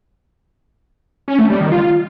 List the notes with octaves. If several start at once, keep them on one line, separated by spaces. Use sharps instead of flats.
C#4
A3
G3
D#3
F4